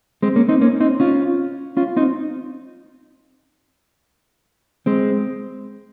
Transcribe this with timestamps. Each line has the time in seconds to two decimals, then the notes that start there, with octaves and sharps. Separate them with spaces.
0.22 G#3 C4
0.36 A#3 C#4
0.48 C4 D#4
0.61 A#3 C#4
0.80 C4 D#4
1.00 C#4 F4
1.77 C#4 F4
1.96 C4 D#4
4.86 G#3 C4